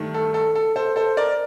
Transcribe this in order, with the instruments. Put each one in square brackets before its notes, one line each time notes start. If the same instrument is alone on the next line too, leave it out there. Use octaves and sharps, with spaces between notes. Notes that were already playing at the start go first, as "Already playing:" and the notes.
Already playing: [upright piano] G2 D#3 A3
A4
A4
A4
A4 C5
A4 C5
A#4 D5